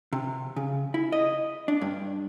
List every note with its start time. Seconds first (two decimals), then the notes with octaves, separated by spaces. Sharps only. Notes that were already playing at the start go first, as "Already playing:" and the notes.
0.13 C3
0.56 C#3
0.94 E4
1.12 D#5
1.68 D4
1.81 G2